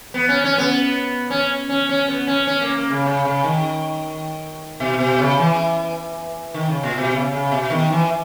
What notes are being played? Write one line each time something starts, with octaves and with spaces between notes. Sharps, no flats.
B3
C#4
C#4
B3
C#4
C#4
C#4
B3
C#4
C#4
A#3
A#3
C#3
C#3
C#3
D#3
B2
B2
C#3
E3
D#3
C#3
A#2
B2
C#3
C#3
B2
D#3
E3